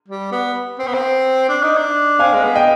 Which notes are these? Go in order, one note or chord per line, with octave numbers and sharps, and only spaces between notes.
G3
B3
C4
B3
C4
D4
D#4
D4
C4 F5 G#5
G#3
B3
D#5 G5